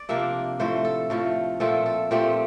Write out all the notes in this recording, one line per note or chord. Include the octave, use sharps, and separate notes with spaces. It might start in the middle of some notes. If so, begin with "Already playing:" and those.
Already playing: D5
C3 F3 A#3 D4 E5
A2 F3 A3 C5
A4
A2 F3 A3
A#2 F3 A3 C4 A4
A4
A#2 F3 A3 C4 G4